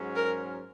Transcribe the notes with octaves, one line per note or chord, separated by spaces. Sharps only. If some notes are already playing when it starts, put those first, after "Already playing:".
Already playing: G#2 F#3 C#4
A#4